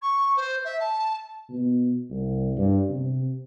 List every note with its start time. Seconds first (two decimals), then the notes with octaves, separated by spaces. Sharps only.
0.02 C#6
0.36 C5
0.64 E5
0.80 A5
1.49 B2
2.10 C2
2.57 G2
2.89 C3